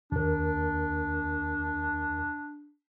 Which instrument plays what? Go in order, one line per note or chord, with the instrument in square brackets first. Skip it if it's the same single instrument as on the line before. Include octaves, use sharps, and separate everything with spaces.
[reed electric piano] D#2 A#4 [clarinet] D4